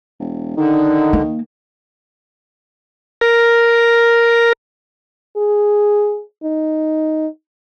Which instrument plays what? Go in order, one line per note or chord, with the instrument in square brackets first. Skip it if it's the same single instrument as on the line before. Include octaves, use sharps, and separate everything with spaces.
[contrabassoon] E1
[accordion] D3 [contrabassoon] D#3 [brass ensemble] D#4
[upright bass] A#3
[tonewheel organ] A#4
[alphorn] G#4
D#4